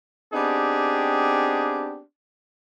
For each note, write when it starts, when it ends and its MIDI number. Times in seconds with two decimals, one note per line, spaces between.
0.33 2.00 59
0.33 2.00 60
0.33 2.00 62
0.33 2.00 63
0.33 2.00 67
0.33 2.00 68